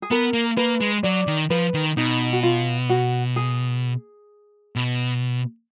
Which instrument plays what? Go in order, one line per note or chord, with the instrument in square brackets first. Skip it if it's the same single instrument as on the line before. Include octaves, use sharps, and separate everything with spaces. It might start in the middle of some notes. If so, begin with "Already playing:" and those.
[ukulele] G#4
[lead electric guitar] B3 [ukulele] A#4
[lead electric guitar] A#3
[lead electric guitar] A#3 [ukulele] B4
[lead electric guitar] G#3
[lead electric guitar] F#3 [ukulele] D5
[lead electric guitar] D#3
[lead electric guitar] F3 [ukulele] B4
[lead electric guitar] D#3
[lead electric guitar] B2 [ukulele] D#4
[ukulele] F#4
F4
F#4
G#4
[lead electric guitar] B2